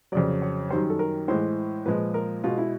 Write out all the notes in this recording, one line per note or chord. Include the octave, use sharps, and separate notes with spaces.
F2 C#3 F#3 D5
C#5
F#2 D#3 G3 C5
A4
A#4
A2 E3 G#3 C5
A#2 F3 G#3 B4
A#4
B2 G#3 F4
E4